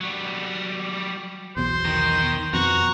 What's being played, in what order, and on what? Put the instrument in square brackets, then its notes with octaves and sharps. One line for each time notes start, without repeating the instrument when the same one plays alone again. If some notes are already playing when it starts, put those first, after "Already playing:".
[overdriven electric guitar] F#3 G3
[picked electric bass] B1 E2 B2 [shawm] C5
[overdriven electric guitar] D#3 A#4
[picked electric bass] F2 B2 [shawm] F#4 [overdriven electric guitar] A#5